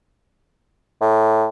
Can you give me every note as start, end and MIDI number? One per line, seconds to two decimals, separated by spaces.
1.01 1.46 45